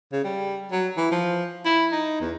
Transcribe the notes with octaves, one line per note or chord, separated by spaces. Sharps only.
C#3
G3
F#3
E3
F3
E4
D#4
E2